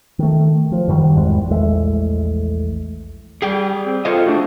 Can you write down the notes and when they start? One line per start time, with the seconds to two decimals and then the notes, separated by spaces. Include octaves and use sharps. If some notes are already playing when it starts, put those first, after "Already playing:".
0.19 D#3 A3
0.72 F3
0.88 F#2 D#3 F#3 G3
1.16 G#1 E2 G#3
1.50 A#1 E2 G#3 A3
3.42 G3 G#4 G5
3.85 C4
4.05 F4 A4 C5 D#5
4.26 A3 D4 F#4